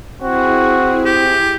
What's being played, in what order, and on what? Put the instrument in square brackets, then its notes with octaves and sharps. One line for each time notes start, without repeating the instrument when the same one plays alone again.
[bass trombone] C4 [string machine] E4 G#4 [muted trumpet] F#4
[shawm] G4